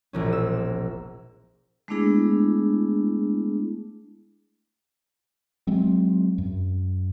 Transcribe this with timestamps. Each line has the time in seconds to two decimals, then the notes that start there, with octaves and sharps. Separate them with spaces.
0.13 E1 A#1 C#4
0.32 E6
1.88 G#3 A3 B3 D4 E4 G#4
5.67 F#3 G#3 C4
6.38 F#2